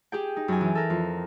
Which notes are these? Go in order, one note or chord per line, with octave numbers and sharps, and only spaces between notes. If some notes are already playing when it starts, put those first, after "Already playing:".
G4 G#4 G5
D#4
F#2 G#5
E3
A4 A#4
F2